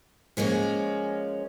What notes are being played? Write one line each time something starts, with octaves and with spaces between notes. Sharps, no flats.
F3 G#3 A#3 C#4